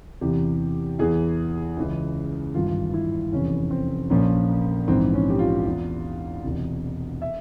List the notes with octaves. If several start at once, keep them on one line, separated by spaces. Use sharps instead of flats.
E2 C3 E3 G4
E2 E3 G#4
C#2 C#3 E3
G#1 G2 E3 F4
E4
F1 E2 C3 E3 C#4
C4
A#1 A#2 F3 C#4
A#1 G#2 E3 C4
C#4
G4
F4
E2 E3
E1 E2 C3
E5